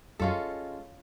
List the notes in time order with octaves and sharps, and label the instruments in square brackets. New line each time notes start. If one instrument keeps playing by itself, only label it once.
[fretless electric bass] F#2 [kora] G#3 C#4 F4 A4